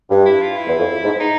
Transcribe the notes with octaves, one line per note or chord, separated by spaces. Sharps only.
G2
E4
F4
E4
E2
F2
G#2
D#4